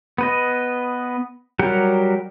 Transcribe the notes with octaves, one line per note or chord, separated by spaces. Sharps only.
B3 B4 D#5
F#3 G3 G4 A#4 F#5